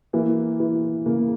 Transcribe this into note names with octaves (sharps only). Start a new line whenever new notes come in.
E3 A#3
E3
C#3 A#3